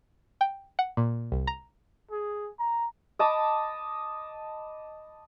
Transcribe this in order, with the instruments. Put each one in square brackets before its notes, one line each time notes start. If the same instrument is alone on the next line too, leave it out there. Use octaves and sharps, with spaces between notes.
[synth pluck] G5
F#5
A#2
C2
A#5
[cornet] G#4
A#5
[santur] D#5 A5 B5 D6